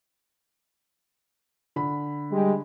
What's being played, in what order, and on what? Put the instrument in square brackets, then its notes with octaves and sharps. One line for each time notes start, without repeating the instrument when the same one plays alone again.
[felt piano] D3 B5
[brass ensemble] G3 G#3 G4